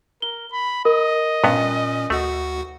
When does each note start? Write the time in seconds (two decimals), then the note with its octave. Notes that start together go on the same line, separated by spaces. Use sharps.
0.22 A#4 G7
0.52 B5
0.85 A#4 D#5
1.44 G2 A#2 B3 C#4
2.10 D2 A3 F#4 F#5